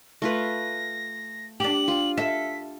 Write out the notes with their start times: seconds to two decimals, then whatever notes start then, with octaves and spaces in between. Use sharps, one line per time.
0.22 A3 F4 B4 A#6
1.60 D4 G4 F#7
1.88 F4
2.18 A4 E5 B6